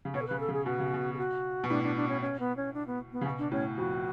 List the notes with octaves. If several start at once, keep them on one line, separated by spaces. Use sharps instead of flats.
C#3
B2 C#5
A4
C#3 B4
A4
C#3
G#4
B2 F#4
C#3
B2
G#4
F#4
B2
A2 D4
D4
D4
C#4
C#4
B3
C#4
D4
B3
B3
C#3
B2
D4
A2 C#4
F2 F#4